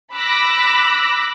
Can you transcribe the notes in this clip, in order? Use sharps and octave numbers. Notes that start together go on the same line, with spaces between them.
B5 D6 E6 F#6 A#6